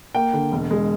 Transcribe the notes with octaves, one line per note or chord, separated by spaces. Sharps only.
A#3 G5
D3
E1
G#3